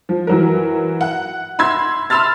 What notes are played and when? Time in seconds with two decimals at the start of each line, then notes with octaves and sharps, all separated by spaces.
0.09 F3
0.27 E3 F#3 A#4
1.01 F#5
1.59 B5 C6 E6 G#6
2.10 B5 C6 E6 F6 A6